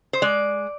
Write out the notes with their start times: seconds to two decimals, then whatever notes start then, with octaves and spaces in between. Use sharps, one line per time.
0.13 C5
0.22 G#3 D5